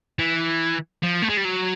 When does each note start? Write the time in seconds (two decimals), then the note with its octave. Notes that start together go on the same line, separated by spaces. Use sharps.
0.19 E3
1.03 F3
1.22 A3
1.29 G#3
1.37 G3
1.45 F#3